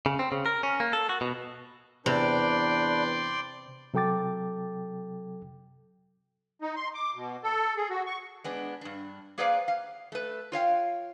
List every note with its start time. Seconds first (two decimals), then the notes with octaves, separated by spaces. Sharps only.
0.06 C#3
0.19 C4
0.32 C#3
0.46 A#4
0.63 C#4
0.80 A#3
0.93 A4
1.09 F#4
1.21 B2
2.06 E2 C3 D4 B4 D5 G5 C6
3.94 C3 F#3 A4 G5 D6 A6
6.62 D#4
6.76 C6
6.94 D6
7.15 B2
7.43 A4
7.77 G#4
7.90 F#4
8.06 C#6
8.44 G#3 B3 D4
8.81 G2 D4
9.38 A#3 G#4 B4 C5 D5 F5
9.68 F5
10.12 A3 B4
10.52 F4 C#5 F5 G5